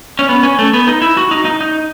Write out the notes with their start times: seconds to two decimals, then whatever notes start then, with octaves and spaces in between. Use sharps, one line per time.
0.19 C#4
0.29 B3
0.43 C#4
0.59 A3
0.73 B3
0.88 D#4
1.02 E4
1.17 F#4
1.31 D#4
1.45 D#4
1.61 D#4